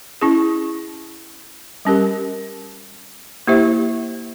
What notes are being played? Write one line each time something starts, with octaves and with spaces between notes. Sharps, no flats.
C#4 E4 G#4
G3 C#4 G4 A#4
A#3 E4 G4 C5 E5